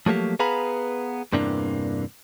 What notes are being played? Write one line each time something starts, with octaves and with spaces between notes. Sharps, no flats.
F3 F#3 A3 A#3 G4
B3 G#4 B4 F5 A#5 B5
E2 G2 C3 E3 A#3 D4